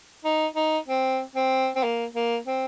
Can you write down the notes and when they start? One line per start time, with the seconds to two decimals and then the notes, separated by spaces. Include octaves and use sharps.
0.25 D#4
0.56 D#4
0.88 C4
1.35 C4
1.76 C4
1.83 A#3
2.15 A#3
2.47 C4